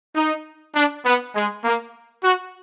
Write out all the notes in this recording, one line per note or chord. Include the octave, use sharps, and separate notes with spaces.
D#4
D4
B3
G#3
A#3
F#4